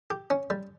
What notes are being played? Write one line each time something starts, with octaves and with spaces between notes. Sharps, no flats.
G4
C#4
G3